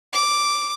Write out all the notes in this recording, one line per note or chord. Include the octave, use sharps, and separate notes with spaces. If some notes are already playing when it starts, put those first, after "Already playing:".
D6